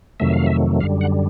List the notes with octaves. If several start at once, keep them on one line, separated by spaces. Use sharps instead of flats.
F2 C3 D#3 F#3 A3 E5
F5
E5
F#2 D3 G3 F5
F#5